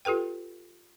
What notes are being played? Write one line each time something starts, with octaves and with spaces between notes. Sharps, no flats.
F4 G4 A4 B4 G5